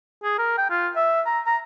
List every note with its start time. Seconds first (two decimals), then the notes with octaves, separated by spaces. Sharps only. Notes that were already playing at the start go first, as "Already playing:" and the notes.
0.24 G#4
0.39 A#4
0.58 G5
0.70 F4
0.96 E5
1.26 A#5
1.47 A#5